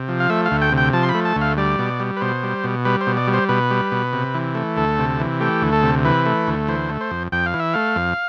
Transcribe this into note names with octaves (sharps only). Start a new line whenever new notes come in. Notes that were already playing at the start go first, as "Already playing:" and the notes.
Already playing: C3
F3
F5
A3 E5
F5
D2
G5
C3
G5
F3 A5
C6
B5
A3
A5
D2
F5
G3 D5
B2
G3
B4
B2 C5
G3
B2
G3 B4
C5
B2
D5
G3
C5
B2 B4
G3
B2
C3
E3
A3
D2 A4
C3
E3
A3 G4
D2
A4
C3
E3 B4
A3
D2
E3 C5
A3
C5
F2
F2 G5
F5
E3
E5
A3 F5
F2